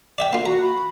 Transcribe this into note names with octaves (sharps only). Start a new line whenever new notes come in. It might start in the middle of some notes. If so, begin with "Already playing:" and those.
D5 E5 G5
A#3 F4
F#4 A#5
B5